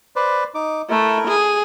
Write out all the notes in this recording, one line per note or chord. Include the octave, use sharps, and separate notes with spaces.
B4 C5 D5
D#4 D6
A3 E4 A#4
G#4